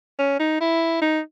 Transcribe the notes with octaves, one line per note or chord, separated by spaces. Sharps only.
C#4
D#4
E4
D#4